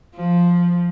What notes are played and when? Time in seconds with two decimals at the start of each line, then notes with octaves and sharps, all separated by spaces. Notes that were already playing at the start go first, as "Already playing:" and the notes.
0.15 F3